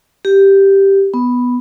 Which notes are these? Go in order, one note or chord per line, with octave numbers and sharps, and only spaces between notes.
G4
B3